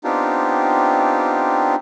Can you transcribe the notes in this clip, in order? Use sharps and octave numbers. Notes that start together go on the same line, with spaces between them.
B3 C4 D4 D#4 F4 G4